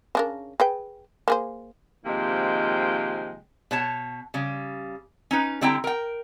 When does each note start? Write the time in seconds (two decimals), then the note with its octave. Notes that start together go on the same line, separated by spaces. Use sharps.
0.15 C#3 D4 A#4
0.60 G#4 B4 G5
1.28 A#3 G#4 C5
2.05 C3 D#3 F3 G#3 A#3 G5
3.71 B2 C#5 A5
4.34 C#3 G3
5.31 C#4 D#4 B4
5.61 D3 G3 C4 E4 G5 A#5
5.84 A#4 G5